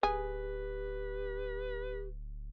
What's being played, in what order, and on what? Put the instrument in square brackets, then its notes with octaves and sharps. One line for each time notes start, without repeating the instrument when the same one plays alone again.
[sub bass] D1 [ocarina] G4 [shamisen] G#4 [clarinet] B4